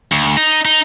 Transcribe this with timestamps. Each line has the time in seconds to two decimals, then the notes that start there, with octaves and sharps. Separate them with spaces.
0.12 D2
0.37 D#4
0.65 D#4